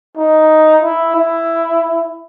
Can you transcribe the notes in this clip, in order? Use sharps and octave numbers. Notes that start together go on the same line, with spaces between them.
D#4
E4
E4